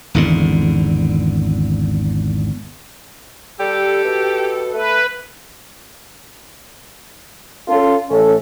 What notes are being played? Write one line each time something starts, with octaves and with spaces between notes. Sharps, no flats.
G#1 E2 D3
G3 G4 A4
B2
A3 B4
C#4 F4 A4
A1 C#4 A4